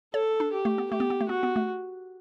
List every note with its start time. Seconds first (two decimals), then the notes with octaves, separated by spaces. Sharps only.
0.14 A4 C#5
0.40 D4
0.53 G4
0.65 A3
0.78 B3
0.91 A3 G4
1.00 B3
1.10 B3
1.21 A3
1.29 B3 F#4
1.43 B3
1.56 A3